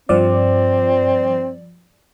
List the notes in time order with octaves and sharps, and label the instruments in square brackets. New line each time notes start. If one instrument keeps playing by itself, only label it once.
[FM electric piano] G2 F3 D5 [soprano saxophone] C4